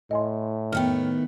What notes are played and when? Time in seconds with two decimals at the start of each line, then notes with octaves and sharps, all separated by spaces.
0.11 A2 D#5 G#5 C6
0.72 D#3 A3 B3 G5 F6